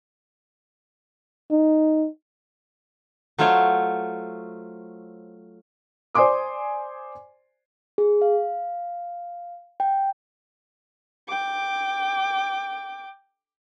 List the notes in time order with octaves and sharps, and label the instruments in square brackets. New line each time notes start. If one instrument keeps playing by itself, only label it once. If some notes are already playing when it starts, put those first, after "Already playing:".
[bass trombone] D#4
[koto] F#3 A3 F4 C5 C#5
[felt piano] C5 D5 G#5 C6 D6 D#6
[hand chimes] G#4
F5
G5
[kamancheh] G5 D6